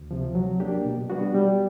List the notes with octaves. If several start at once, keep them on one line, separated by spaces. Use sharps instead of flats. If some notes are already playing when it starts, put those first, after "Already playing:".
Already playing: D2
C3 F3
F#3
A#3 D4 G4
B2
G3 B3 D4 F#4
G3